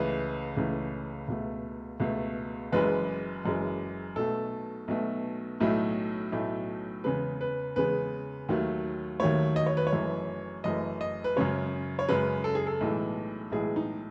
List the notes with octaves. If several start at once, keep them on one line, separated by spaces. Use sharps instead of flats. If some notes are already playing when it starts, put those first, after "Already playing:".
Already playing: C#2 C#3 E3 A3 B4
C#2 C#3 E3 A3
C#2 B2 A3
C#2 B2 A3
F#1 F#2 E3 G#3 B4
F#1 F#2 E3 G#3
B1 B2 A3 A4
B1 B2 A3
B1 A2 F#3 A3
B1 A2 F#3 A3
E2 C#3 G#3 B4
B4
E2 C#3 G#3 B4
D#2 D#3 F#3 A3
D#2 D#3 F#3 A3 C#5
D#5
C#5
B4
C#5
F#1 F#2 E3 A3
F#1 F#2 E3 A3 D#5
D#5
B4
F#2 C#3 G#3 C#5
C#5
F#2 C#3 G#3 B4
A4
G#4
A4
B1 A2 E3 G#3
B1 A2 E3 G#3 G#4
D#4